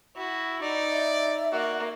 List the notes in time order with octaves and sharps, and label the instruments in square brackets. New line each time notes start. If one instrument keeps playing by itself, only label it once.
[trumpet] E4 [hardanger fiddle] F#4
[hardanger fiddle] D#4 [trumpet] D5
[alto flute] E5
[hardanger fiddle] A#3 [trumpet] F#4